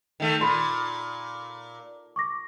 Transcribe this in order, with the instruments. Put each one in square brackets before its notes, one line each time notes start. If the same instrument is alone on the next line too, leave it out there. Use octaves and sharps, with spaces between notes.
[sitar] D#3 A3
[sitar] A#2 [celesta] B5 C6
[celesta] C#6 D6 A#6